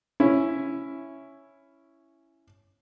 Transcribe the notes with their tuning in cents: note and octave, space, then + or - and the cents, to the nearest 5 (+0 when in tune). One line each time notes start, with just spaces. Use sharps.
C#4 +0 E4 +5